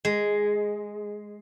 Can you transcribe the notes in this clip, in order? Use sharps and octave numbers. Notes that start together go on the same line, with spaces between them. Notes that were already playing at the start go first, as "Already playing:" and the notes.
G#3